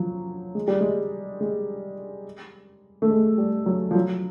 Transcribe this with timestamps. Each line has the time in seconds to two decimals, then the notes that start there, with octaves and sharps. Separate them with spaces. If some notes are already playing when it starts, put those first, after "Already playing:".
Already playing: F3 F#3
0.55 G#3
0.68 G3
0.81 G#3
1.41 G#3
3.02 A3
3.10 G#3
3.38 G3
3.66 F#3
3.91 F3
3.95 F#3